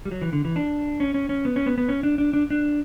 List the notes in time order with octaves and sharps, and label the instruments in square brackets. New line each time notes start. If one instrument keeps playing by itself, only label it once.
[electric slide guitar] G3
F#3
E3
D3
E3
D4
C#4
C#4
C#4
B3
C#4
B3
B3
C#4
D4
D4
D4
D4